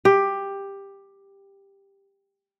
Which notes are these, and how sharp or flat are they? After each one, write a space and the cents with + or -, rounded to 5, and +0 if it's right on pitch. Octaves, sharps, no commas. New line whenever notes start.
G4 +10